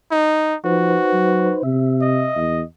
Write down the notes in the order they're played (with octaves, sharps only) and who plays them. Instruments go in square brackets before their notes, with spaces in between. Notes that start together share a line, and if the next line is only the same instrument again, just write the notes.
[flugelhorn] D#4
[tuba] F3 [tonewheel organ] D#4 B4 C5 [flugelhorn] F#4
[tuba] F#3
[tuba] C3 [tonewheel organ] E5
[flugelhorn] D#5
[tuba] E2